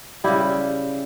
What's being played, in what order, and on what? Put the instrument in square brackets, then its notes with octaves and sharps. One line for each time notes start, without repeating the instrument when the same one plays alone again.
[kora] C#3 G3 E4 G4